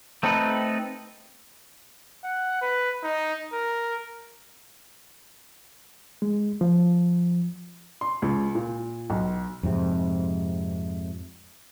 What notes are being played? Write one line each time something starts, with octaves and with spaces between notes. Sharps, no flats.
A3 C4 D#4 A4 B4
F#5
B4
D#4
A#4
G#3
F3
C6
C#2
A#2
B1
F2 G#2 C3